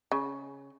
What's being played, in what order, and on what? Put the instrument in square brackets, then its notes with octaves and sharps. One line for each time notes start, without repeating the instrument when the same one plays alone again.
[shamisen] C#3